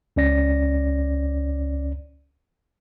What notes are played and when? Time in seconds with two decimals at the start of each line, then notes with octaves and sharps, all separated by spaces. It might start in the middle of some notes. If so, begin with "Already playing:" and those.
0.16 C#2 C#4 D5 A#6